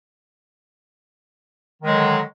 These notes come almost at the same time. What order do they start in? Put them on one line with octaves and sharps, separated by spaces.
D#3 G#3 F#3 D3